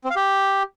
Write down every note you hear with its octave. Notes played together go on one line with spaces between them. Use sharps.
C4
F5
G4